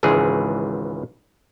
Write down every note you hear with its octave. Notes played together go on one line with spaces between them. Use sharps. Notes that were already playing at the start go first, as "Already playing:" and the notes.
G#1 C#2 G#2 E3 G#4